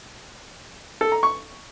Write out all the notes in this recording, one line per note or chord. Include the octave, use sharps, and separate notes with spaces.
A4
A#5
C#6